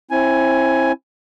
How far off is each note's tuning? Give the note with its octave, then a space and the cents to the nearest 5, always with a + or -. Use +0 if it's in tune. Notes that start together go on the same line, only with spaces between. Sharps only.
C4 +35 E4 +0 G#5 +10